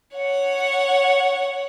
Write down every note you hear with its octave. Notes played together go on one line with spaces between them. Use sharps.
C#5 F#5